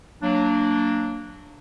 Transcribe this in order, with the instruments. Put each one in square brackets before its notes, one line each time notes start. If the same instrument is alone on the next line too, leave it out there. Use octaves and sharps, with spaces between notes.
[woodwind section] F#3 A#3 D4